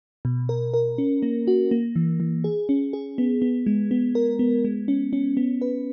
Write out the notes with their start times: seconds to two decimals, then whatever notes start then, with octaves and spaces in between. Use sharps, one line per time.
0.25 B2
0.49 A#4
0.74 A#4
0.98 C#4
1.22 A#3
1.47 F#4
1.71 A#3
1.96 E3
2.20 E3
2.44 G#4
2.69 C#4
2.93 G#4
3.18 B3
3.42 B3
3.66 G#3
3.91 B3
4.15 A#4
4.39 B3
4.65 G#3
4.88 C#4
5.13 C#4
5.37 B3
5.61 B4